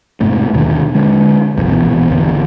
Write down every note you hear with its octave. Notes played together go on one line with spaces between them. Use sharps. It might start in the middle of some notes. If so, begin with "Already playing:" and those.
F2 G#2 C3 A3
D#2 B2 D3 D#3
D3 G#3
G1 C2 F2
A#1 B2 E3 B3
G#1 E2 B2 D3